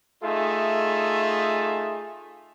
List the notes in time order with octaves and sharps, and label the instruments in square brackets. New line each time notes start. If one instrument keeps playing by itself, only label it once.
[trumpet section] A3 D#4 F4 G#4 E5